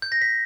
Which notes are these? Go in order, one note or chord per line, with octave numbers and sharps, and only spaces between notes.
G6
A#6
B6